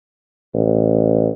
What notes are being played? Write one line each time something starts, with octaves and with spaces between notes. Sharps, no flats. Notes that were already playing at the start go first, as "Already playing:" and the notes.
A1